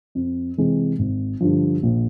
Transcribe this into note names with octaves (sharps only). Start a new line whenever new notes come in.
F2
C3 E3 G#3 C4
G#1
G2 D3 F3
A#1